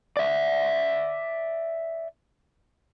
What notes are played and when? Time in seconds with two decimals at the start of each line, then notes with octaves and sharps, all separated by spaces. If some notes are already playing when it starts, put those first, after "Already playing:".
0.17 D5 E5